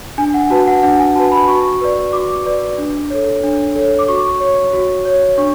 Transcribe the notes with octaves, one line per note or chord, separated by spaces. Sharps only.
D4 G#5
F#5
F#4 B4 A5
F#5
D4 F#5
G#5
F#4 B4 A5
B5
F#4 C#6
B4 D5
F#4 D6
B4 D5
D4
A4 C#5
D4
A4 C#5
D6
F#4 C#6
C#5
F#4
C#5
D4 C#6